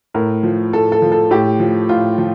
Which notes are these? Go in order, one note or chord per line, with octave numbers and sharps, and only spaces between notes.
A2 A#4
F3
A2 A4
A4
F3
A4
A2 G4
F3
A2 F4
F3